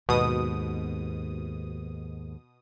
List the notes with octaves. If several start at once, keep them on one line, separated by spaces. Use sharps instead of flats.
D#2 G#2 B2 D#6